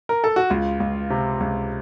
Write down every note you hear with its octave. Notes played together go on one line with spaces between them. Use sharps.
A#4
A4
F#4
C#2 F4
C#2
C3
C#2